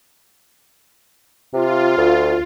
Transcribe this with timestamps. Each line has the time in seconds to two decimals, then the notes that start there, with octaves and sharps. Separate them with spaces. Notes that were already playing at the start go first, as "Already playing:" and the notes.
1.53 C3 F4
1.97 D2